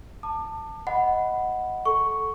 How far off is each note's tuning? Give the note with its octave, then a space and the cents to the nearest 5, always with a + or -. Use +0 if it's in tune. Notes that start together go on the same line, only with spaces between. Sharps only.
A5 +15 D6 +40
D#5 +15 F#5 +0 B5 +0
A4 -5 C#6 +0